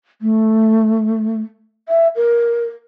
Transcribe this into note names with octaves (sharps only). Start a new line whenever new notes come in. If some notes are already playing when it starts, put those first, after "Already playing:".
A3
E5
A#4